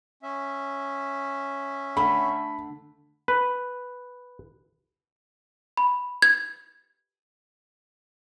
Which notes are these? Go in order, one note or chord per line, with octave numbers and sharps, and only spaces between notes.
C#4 E5
D3 A3 B5
B4
B5
G#6